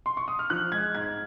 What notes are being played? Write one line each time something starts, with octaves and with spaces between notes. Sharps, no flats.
C6
C#6
D#6
F6
F3 F#6
G#3 G#6
G#2 G#6